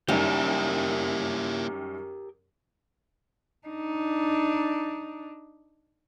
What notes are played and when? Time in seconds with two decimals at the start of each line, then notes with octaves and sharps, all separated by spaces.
0.08 F#2 D#3 G3 A#3 E4 G4 A#4
3.67 D4 D#4